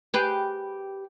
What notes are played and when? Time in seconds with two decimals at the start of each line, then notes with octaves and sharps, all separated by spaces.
0.14 G4 G#4 B4